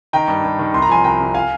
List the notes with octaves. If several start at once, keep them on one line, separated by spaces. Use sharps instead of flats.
D#3 G5 A#5
G2
G2
D#3
C2 C6
A#5
F3 G#5 C6
C2 G5 A#5
C3
F5 G#5